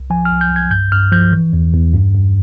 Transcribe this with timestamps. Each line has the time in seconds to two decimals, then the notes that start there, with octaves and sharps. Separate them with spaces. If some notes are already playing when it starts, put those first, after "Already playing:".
Already playing: C2
0.10 F3 G#5
0.25 F6
0.31 C2
0.41 G6
0.50 C2
0.56 G#6
0.71 G2 G6
0.92 G2 F6
1.12 F3 G6
1.33 E3
1.53 E2
1.74 E2
1.93 G2
2.14 G2